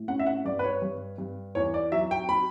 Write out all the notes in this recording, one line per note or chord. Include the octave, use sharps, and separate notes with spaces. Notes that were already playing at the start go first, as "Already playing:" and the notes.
Already playing: A2
C#4 F#5
E5
F#5
G2 D5
B4
C#5
G2
G2
E2 C#5
D5
F#3 E5
G5
B5